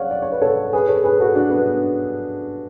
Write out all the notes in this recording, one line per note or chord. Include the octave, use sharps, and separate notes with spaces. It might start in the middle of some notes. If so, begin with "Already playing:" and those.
Already playing: C#5 D5 F5 F#5
D5
C#5
B4
A4 C#5
G#4 B4
A4 C#5
G#4 B4
F#4 A4
D4 F#4
B3 D4